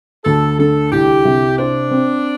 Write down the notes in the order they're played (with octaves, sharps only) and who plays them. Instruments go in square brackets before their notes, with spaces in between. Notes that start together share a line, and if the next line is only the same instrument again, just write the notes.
[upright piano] D2 [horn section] A4
[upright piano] D3 [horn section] A4
[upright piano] C2 [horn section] G4
[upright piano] C3
[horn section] D4 [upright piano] C5
[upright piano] C4